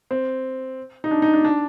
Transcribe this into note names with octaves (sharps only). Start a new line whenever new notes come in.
C4
D#4
D4
D#4
D4
D4